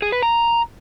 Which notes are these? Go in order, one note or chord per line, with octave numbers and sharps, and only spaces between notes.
G#4
B4
A#5